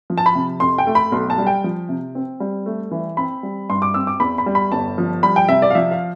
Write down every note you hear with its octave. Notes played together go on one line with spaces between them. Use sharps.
F3
A5
B5
C3
F2 C6
G5
A3
B5
B1 C6
A5
G3
G5
F3
C3
C4
G3
A3
E3
C4 B5
G3
G2 C6
D6
C4 E6
D6
E2 B5
B5
G3
B5
G1 A5
F3
G3 B5
G5
C3 E5
D5
F5
F3 E5
F5